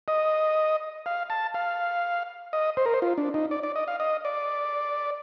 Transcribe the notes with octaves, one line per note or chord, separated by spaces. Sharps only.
D#5
F5
A5
F5
D#5
C5
A#4
C5
F4
D4
D#4
D5
D5
D#5
F5
D#5
D5